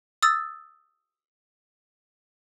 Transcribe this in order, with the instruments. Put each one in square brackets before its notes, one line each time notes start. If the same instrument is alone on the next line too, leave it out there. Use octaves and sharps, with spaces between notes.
[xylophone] D#6 E6 A6